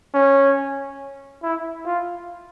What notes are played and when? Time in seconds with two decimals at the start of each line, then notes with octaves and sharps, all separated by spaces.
0.14 C#4
1.43 E4
1.86 F4